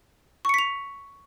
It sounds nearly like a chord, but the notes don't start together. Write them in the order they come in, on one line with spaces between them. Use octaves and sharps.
C#6 C#7 B6 F7